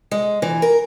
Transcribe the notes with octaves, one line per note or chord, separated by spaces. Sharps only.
G#3
E3
A#4